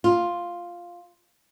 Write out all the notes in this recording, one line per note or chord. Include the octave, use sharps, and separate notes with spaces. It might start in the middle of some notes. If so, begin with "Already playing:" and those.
F4